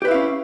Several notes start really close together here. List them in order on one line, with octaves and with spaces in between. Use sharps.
G4 B4 E4 F5 C#4